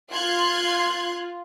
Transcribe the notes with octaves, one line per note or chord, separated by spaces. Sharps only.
F4 C6 F#6 G#6